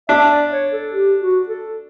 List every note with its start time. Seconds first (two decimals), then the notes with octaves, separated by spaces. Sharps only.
0.09 D4 E5
0.29 D5
0.51 C#5
0.72 A4
0.92 G4
1.20 F#4
1.49 A4